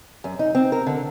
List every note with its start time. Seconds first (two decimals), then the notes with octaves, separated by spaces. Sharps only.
0.24 F#2
0.39 D#4
0.55 C4
0.72 A#4
0.86 D3